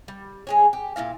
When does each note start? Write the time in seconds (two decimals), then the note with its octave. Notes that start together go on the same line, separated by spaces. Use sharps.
0.08 G3
0.47 G#3 G#4 C#5
0.73 G4
0.96 A#2 A#3 E4 F5